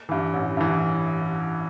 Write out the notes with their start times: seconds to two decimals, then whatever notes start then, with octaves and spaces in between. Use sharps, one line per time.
0.09 G2 E3
0.33 A1
0.57 G2 E3